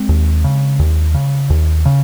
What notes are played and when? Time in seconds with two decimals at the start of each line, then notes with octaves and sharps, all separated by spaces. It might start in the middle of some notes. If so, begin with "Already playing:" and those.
Already playing: G#3 C4
0.09 D#2
0.44 C#3
0.79 D#2
1.14 C#3
1.50 D#2
1.85 C#3